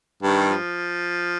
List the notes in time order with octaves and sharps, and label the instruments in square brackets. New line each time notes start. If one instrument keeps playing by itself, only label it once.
[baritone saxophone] G2 [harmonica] D#3
[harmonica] G3
F3